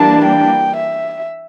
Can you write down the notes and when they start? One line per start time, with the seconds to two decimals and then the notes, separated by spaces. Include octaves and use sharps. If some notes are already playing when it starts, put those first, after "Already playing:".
Already playing: E3 G3 A#3 D4 A5
0.25 G5
0.76 E5